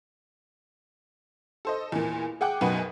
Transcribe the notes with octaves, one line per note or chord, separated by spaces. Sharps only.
A4 C5 D#5
E2 A#2
G#4 F#5 G5 D6 F#6
B1 F#2 B2 B4 F#5